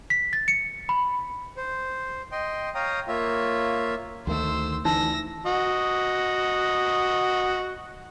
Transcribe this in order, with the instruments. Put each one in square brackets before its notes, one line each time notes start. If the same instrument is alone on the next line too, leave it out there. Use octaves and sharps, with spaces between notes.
[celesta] B6
A6
C#7
B5
[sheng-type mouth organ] C5
D#5 G5 C6
C#5 F5 G5 A#5 D#6
A#3 F4 C#5 E5
[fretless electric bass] D2 D#3 A3 [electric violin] C5 E6
[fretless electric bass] D2 E3 [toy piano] D#4 [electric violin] E6 A#6
[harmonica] F#4 D#5